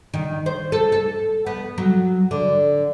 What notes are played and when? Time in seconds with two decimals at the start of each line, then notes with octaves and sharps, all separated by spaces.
0.14 D#3
0.46 C5
0.72 A4
0.92 A4
1.46 B3
1.78 F#3
2.31 D3